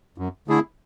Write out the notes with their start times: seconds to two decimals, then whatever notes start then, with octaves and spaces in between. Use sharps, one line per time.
0.18 F#2
0.48 D3 A3 E4 G#4